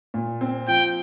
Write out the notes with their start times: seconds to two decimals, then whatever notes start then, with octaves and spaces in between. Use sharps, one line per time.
0.14 A#2
0.41 C4
0.68 F3 G5